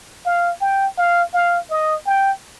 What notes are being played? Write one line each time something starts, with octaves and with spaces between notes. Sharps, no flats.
F5
G5
F5
F5
D#5
G5